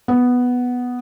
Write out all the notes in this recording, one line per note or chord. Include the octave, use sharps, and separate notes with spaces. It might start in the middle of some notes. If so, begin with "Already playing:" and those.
B3